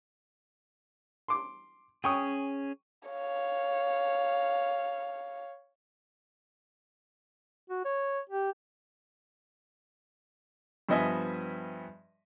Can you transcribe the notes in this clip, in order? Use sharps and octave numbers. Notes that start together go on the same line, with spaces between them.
C6 D6
C#4 G#4 G5 C#6 D#6
C#5 F5
F#4
C#5
G4
G2 F3 B3 D#5 E5 G#5